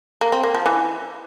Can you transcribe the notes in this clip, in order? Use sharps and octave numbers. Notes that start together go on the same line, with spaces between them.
A#3
C4
A#3
F3
E3